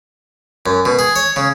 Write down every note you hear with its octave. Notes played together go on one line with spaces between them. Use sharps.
F#2
B2
G#4
C#5
C#3